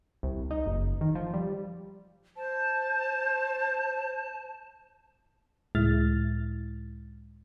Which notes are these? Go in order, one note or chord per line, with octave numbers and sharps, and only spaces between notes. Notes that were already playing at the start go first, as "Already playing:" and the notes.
C2
D#4
F#1
D#3
F3
G3
C5 A5
C#2 A2 G#3 E4 F6 A6